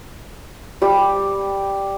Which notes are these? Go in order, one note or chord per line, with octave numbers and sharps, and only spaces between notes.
G3 G4 D6